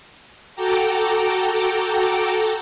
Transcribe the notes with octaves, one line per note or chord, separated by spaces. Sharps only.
F#4 A4 G5 A#5 D6